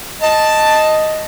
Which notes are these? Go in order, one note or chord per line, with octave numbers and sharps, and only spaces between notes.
D#5 A5